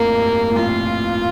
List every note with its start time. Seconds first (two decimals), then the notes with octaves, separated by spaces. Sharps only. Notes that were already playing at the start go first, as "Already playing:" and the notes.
Already playing: F2 A2 A#3
0.16 G2
0.50 A#2
0.55 F2 A2 F4